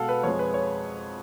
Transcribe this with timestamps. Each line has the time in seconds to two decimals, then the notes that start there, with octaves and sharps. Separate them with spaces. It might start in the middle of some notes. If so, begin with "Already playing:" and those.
Already playing: B2 G#3 A4 F5 F#5
0.09 B4
0.23 F2 F3 G#3 C#5
0.39 B4
0.54 C#5